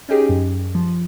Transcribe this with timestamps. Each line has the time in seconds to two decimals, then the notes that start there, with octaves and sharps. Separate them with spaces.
0.09 C#4 D#4 G4 G#4
0.29 F#2
0.75 F3